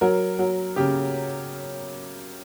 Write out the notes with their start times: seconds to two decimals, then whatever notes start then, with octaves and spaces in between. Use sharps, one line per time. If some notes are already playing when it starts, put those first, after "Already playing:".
0.01 F#3 A#4
0.39 F#3
0.76 C#3 G4